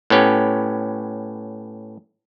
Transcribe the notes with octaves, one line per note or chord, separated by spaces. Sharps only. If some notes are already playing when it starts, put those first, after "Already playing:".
A2 B3 C#4 G4